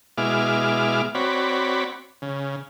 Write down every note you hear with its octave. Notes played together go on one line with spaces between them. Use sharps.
B2 G#3 E4 D6 F6
C4 F#4 C#5 D5 B5
C#3